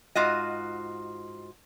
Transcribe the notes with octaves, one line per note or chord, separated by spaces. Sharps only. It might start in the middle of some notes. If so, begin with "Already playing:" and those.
G#2 F4 F#4 D#5